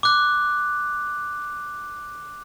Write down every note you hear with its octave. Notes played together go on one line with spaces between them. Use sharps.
D6 F#6